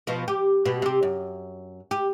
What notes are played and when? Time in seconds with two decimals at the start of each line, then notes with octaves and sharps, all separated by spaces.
0.07 B2 F3
0.28 G4
0.65 B2 G3
0.82 C3 G4
1.03 F#2
1.91 G4